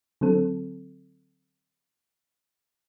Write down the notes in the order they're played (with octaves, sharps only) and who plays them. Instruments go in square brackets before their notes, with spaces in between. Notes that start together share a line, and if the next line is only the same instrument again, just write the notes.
[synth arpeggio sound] D3 F#3 C4 A4